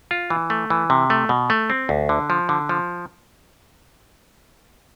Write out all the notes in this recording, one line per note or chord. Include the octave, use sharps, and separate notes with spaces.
F4
E3
A3
E3
C3
A3
B2
A3
C4
D2
D3
F3
D3
F3